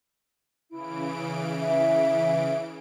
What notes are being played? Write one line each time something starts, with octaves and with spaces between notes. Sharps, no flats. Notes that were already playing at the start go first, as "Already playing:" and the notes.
C#3 E3 E4 D7
E5